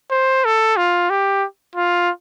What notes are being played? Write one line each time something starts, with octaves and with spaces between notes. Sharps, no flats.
C5
A4
F4
G4
F4